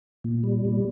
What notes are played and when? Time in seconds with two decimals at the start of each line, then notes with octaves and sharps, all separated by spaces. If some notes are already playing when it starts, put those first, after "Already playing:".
0.24 A#2
0.44 G3
0.65 A#2